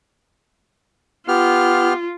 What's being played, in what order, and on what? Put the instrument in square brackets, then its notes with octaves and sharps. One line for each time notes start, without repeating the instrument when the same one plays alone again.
[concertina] B3 G4 F6 [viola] F4